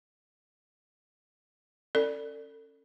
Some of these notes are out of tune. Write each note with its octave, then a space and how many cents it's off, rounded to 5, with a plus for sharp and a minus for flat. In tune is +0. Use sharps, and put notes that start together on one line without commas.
C#4 -15 A4 +35 D5 +0